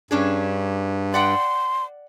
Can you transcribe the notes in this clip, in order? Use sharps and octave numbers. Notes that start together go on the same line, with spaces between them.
G2 C#4 D4 G#4
D5 F#5 G5 C6